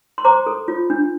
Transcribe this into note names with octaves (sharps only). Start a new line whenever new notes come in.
C6
C5 A#5 D6
A4
F4
D4